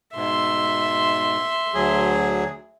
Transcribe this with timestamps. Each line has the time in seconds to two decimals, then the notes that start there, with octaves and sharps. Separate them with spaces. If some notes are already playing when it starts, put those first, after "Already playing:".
0.15 G#2 B2 E5 C6
1.74 D2 F#3 G#4